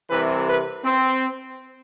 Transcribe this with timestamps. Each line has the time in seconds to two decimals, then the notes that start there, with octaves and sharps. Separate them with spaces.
0.10 C2 C3 E3 B4
0.47 B4
0.84 C4